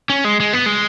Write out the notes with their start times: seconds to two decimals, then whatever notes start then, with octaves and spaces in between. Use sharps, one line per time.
0.10 C#4
0.25 G#3
0.40 G#3
0.53 B3
0.66 G#3